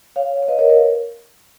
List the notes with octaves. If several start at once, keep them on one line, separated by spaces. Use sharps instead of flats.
C#5 F5
C#5
B4 D#5
A#4 C#5
A#4 C#5